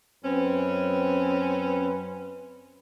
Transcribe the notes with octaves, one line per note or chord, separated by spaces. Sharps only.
F#2 C4 C#4 B4